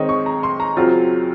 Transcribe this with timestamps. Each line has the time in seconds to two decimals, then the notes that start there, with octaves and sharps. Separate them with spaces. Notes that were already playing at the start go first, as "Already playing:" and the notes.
Already playing: D#3 G#3 C4 D#4 C#5 D#5
0.09 C#6
0.26 A#5
0.43 C6
0.60 A#5
0.77 F#2 C#3 F#3 C4 F4